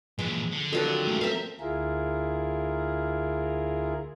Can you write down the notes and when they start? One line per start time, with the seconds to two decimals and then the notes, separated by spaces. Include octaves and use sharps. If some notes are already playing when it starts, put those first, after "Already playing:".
0.19 A#2 E3 F3 G#3
0.51 D3
0.73 D#3 F#3 G3 C#4 F4 A4
1.07 G#3 A3 F5
1.21 C4 A#4 E5 F5
1.60 D2 E4 F4 G#4 A#4